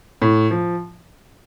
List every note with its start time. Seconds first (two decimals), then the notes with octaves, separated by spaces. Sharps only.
0.22 A2
0.51 F3